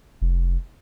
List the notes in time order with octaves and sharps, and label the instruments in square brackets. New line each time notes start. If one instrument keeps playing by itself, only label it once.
[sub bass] F1